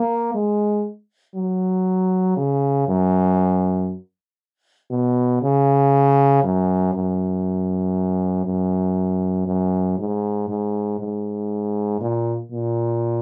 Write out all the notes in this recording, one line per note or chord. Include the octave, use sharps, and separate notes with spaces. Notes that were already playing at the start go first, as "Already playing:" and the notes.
Already playing: A#3
G#3
F#3
C#3
F#2
B2
C#3
F#2
F#2
F#2
F#2
G#2
G#2
G#2
A#2
A#2